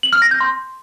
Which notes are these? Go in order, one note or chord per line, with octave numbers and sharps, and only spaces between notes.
F#7
F6
A#6
G6
C6